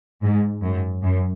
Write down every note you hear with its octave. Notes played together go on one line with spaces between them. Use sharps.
G#2
F#2
F#2